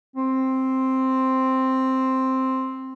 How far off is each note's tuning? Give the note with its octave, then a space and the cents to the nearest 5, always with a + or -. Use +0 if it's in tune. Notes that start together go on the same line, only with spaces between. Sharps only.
C4 +5